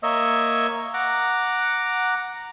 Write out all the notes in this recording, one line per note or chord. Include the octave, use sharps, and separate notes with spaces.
A#3 C#5 D#5 E5
F#5 A#5 D6